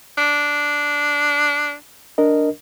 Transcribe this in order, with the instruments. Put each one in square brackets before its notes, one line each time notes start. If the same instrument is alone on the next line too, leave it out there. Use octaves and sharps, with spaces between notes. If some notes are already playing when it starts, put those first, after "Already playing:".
[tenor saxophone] D4
[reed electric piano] D4 A#4 D#5